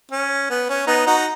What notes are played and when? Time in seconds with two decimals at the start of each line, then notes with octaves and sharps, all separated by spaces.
0.11 C#4
0.50 B3
0.69 C#4
0.87 B3 D#4
1.07 D#4 F#4